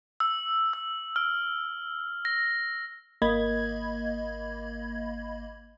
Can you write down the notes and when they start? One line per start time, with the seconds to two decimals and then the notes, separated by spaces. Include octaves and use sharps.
0.20 E6
0.73 E6
1.16 F6
2.25 A#6
3.22 G#1 A#3 D#5 B5 G#6